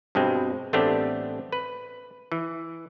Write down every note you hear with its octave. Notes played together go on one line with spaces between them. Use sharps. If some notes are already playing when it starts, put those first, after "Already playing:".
G2 B2 G#3 C4
A1 A3 B3 C4 D4 G4
B4
E3